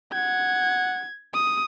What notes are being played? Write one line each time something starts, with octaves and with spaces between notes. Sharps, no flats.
F#5 G#6
D#6